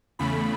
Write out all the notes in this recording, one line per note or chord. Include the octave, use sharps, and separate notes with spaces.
E2 C#3 A3 B5